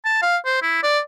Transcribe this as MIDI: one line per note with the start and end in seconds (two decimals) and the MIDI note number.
0.05 0.17 81
0.22 0.37 77
0.45 0.59 72
0.62 0.82 64
0.83 1.00 74